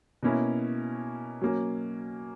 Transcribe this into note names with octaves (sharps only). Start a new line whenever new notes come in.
B2 A#3 C#4 E4
F#3 A#3 C#4